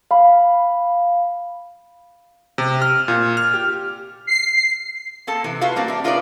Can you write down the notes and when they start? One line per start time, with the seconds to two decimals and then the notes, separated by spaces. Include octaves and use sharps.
0.11 F5 B5
2.58 C3
2.82 F6
3.08 A#2
3.37 F6
3.54 G4
4.27 C7
5.27 A#3 C4 A4 A5
5.44 C3 E3
5.61 A2 F4 F#4 B4 F5
5.76 G3 A#3 C4 D4
5.88 D4 E5
6.04 D#4 F4 A#4 B4 C#5 D5